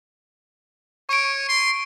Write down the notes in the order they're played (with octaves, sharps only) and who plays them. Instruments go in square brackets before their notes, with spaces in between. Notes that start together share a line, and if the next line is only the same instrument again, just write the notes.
[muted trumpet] C#5 [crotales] C#6 D7
[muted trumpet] C6